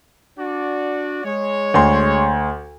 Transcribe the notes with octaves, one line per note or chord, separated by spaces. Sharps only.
D4 F#4 D5
G#3 C#5
D2 C6